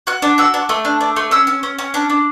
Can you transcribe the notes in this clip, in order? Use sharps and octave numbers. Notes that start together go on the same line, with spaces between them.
F#4 F#6
D4
F#4 E6
D4
A3
D4
D4
A3
C#4 E6
C#4
C#4
C#4
D4
D4